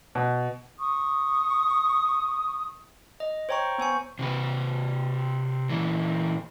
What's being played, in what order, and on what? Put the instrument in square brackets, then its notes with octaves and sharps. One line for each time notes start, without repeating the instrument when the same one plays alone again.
[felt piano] B2
[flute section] C#6 D#6
[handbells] D#5
C5 C#5 G5 A#5 C#6
B3 C5 G#5 C#6
[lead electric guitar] C3 B4
A#2 E3